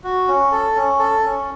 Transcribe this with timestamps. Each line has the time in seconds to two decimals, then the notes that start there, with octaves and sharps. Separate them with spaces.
0.04 F#4
0.28 C#4
0.52 A4
0.76 C#4
0.99 A4
1.24 C#4